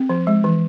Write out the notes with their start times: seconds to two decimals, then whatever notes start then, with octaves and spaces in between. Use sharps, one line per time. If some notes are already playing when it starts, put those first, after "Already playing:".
Already playing: C4
0.09 F3
0.27 G#3
0.44 E3